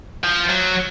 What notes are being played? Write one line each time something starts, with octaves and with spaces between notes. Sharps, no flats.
F3
F#3